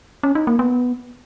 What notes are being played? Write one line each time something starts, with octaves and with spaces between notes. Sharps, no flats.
C#4
D#4
A#3
B3